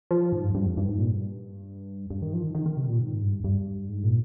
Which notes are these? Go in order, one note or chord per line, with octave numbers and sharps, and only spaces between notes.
F3
G#2
G2
G2
F2
G2
G#2
A#2
G2
G2
D#3
F3
D#3
D#3
D#3
C3
A#2
G#2
G2
G2
G#2
A#2